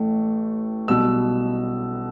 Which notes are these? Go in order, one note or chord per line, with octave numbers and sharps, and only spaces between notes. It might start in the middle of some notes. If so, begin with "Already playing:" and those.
Already playing: A1 A2 A3
B1 B2 G3 E6